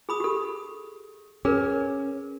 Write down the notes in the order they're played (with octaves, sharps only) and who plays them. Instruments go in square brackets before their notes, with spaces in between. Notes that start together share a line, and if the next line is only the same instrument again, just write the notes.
[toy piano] G#4 B5 D#6
G4 A4
[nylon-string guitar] C#4 [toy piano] G#4 A#4 B4